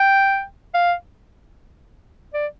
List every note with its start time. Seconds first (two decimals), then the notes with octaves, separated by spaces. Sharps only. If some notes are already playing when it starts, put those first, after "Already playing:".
Already playing: G5
0.74 F5
2.34 D5